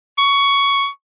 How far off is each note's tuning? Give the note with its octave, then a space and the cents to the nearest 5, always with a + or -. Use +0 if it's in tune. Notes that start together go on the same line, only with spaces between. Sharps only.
C#6 +15